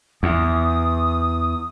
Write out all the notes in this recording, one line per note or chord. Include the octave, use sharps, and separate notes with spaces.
E2 D#6